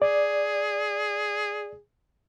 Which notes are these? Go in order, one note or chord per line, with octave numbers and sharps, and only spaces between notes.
G#4 D5